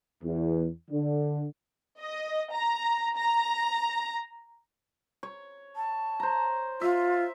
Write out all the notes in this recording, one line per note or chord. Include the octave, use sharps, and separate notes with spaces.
E2
D3
D#5
A#5
A#5
C#5
A5
C5 A#5
F4 E5